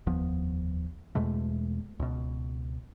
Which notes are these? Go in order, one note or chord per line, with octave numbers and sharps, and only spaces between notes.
F1 D#2 F3 B3
E2 B2 G#3 A3
C#2 B2